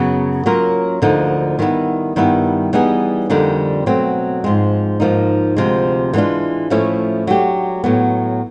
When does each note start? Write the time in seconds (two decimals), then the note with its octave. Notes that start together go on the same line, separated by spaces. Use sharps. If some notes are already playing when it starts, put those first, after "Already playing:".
Already playing: F#2 C#3 F#3 B3
0.46 F#3 A#3 C#4 F4 A#4
1.02 D2 D3 F3 A#3 D#4
1.59 D#3 G3 B3 E4
2.16 G2 D#3 G3 B3 E4
2.73 E3 G3 B3 D#4 G#4
3.30 F2 D3 G3 A#3 D#4
3.86 B2 F#3 A3 C4
4.44 G#2 F3 G#3 C4
5.00 G#2 F3 A#3 D#4
5.57 D2 C3 F3 G#3
6.13 E3 G#3 B3 D4 F4
6.70 A2 F3 A3 C#4 E4
7.27 F#3 A3 D4 G4
7.84 A2 F#3 B3